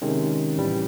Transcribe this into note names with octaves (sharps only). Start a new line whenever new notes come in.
C3 D#3 G#3 C#4
A2 E3 G3